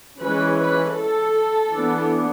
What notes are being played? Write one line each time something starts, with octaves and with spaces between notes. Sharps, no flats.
E3 G#3 C#4 B4
B4
A4
E3 B3 D4